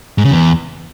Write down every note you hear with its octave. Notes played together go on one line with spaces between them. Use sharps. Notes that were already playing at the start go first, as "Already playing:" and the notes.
G#2
C#3
E2